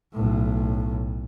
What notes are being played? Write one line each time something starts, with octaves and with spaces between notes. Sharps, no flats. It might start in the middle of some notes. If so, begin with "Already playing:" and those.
B1 A2